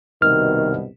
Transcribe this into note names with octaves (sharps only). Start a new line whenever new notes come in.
C2 G2 B2 D#3 F6